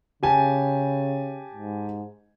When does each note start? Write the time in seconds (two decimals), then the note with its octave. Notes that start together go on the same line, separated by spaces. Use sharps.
0.23 C#3 G4 G#5 A5
1.54 G#2